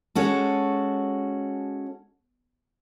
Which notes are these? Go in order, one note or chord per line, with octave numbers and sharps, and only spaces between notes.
G#3 C#4 F#4 A4